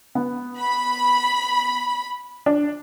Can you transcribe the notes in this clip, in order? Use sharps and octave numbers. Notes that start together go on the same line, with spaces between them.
B3
B5
D4